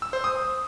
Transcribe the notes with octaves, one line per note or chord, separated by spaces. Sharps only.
E6
C5
D#6